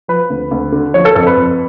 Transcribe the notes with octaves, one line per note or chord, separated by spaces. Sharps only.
F3 B4
D2
D2
D3
F3 C#5
A4
F2 A4
B4
F2